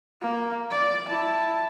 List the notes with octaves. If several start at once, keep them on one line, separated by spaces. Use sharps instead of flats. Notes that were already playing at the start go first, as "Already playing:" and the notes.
A#3
D5
E4 A5